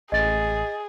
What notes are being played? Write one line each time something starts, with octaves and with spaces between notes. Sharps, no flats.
A1 G#4 D#5 A6